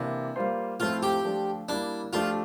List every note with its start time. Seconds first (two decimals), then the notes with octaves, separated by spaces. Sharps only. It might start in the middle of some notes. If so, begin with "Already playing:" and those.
Already playing: C3 E3 A#3 D4
0.36 G3 A#3 F4 C5
0.80 A2 F3 A3 C4 E4 F4
1.03 G4
1.25 F3 A3 D4 F4
1.69 G3 A#3 D4 E4
2.13 F3 A3 D4 F4 G4